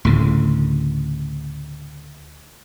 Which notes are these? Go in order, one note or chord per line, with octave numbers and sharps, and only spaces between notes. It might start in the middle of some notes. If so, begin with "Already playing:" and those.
D2 A2 C#3